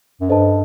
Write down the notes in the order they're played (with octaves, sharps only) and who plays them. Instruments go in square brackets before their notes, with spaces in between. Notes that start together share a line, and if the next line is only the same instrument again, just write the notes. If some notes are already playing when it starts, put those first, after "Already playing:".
[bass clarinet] F#2
[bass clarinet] G2 [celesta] A4 C5 D#5 A5